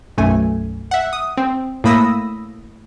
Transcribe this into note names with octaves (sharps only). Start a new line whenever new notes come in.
B1 F#2 A3 G#5
E5 F#5
D#6
C4
A2 A#3 B5 D#6 E6 A#6